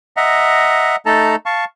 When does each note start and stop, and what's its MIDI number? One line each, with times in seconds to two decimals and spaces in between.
0.17 0.96 75
0.17 0.96 76
0.17 0.96 78
0.17 0.96 82
1.06 1.36 57
1.06 1.36 63
1.06 1.36 69
1.06 1.36 81
1.06 1.36 82
1.46 1.65 77
1.46 1.65 81
1.46 1.65 85